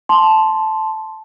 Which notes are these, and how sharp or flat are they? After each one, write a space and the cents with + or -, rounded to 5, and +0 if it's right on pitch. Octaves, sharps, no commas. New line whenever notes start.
A5 -10 C6 +0